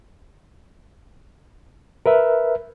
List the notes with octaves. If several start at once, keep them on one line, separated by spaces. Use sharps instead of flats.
A#4 B4 E5